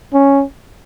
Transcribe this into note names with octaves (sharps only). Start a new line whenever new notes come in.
C#4